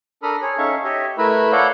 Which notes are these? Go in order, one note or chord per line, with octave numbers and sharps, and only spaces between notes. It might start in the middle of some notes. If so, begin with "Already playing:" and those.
D4 A4 A#4 B5 D#6 F6
G#4 C#5
C#4 D#4 A4 E5 F5 C#6
G4 C#5 D#5 E5
A3 E4 A#4 B4 B5 E6
A4 C#5 D5 F5 F#5 G6